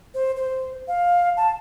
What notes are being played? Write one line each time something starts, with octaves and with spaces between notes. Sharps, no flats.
C5
C5
F5
A5